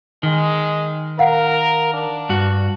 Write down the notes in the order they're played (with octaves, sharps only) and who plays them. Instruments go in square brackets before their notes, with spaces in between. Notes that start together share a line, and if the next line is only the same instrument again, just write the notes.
[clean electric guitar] D#3 [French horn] G#3
[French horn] A#4 [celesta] F5 F#5
[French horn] D4
[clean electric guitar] G2 F#4